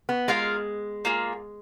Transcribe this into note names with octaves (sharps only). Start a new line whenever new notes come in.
B3
G#3 F4 A#4 F5
A#3 F4 G#4